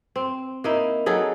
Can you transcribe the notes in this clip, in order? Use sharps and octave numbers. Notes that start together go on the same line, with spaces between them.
C4
A#3 D#4 E4
F#3 D#4 G#4 A4